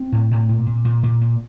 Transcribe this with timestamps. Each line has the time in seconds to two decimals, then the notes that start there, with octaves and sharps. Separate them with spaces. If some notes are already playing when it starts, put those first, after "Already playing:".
Already playing: C4
0.12 A2
0.31 A2
0.49 A#2
0.66 A#2
0.85 A#2
1.03 A#2
1.21 A#2